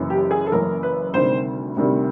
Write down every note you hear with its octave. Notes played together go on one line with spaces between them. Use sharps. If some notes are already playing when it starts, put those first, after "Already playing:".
Already playing: F#1 F#2 C#3 E3
G4
G#4
A4
F#1 F#2 C#3 E3 A#4
B4
D2 C3 D#3 G3 C5
D2 C3 D#3 G3